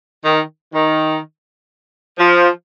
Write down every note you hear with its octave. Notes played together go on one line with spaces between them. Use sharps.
D#3
D#3
F3